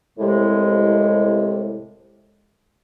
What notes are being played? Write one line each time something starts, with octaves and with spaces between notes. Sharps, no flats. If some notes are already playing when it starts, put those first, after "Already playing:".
C2 A2 C3 G#3